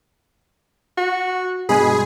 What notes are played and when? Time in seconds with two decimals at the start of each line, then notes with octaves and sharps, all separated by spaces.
0.98 F#4
1.69 G2 B2 G#3 G#4 B5